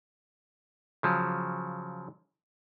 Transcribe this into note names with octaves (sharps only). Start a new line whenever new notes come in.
C#3 F3 F#3